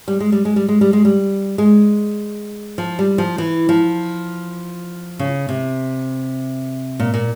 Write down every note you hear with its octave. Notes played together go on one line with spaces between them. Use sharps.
G3
G#3
G3
G#3
G3
G#3
G3
G#3
G3
G#3
F3
G3
F3
E3
F3
C#3
C3
A#2
A#2